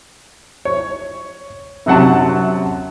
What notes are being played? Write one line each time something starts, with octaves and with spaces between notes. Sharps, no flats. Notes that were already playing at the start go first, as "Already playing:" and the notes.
C#5
F#2 C3 F#3 F#5 A5